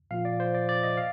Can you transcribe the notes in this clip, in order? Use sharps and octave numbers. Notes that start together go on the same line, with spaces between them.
A#2 F3 A#3 F4 F5
D5
C5
D5
D5
D#5
F5